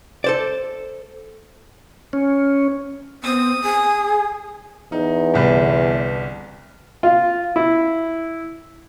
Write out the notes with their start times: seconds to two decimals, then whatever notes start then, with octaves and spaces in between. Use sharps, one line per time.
0.24 A4 C5 D5
2.13 C#4
3.24 B3 C4 D#6
3.64 G#4 G#5
4.92 E2 D#4
5.34 G1 C2 B4
7.03 F4
7.56 E4